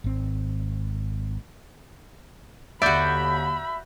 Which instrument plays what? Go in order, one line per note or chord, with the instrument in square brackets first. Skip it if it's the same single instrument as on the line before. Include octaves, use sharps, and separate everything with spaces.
[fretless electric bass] G#1 C4
[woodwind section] D#2 D3 [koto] F#4 D5 [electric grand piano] E5 G6 [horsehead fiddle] B5